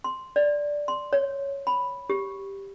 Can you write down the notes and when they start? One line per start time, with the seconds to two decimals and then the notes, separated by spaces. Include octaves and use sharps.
0.04 C6
0.36 D5
0.88 C6
1.13 C#5
1.67 B5
2.10 G4